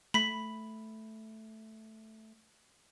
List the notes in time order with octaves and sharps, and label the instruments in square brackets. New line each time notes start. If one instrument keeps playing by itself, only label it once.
[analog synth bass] A3 [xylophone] B5 B6